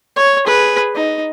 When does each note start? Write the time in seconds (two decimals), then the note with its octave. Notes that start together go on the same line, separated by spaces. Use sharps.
0.16 C#5
0.45 G#4 B4
0.95 D#4